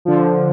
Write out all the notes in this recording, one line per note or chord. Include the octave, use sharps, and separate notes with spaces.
D3 F3